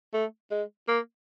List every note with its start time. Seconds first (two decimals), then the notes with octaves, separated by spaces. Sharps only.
0.14 A3
0.51 G#3
0.88 A#3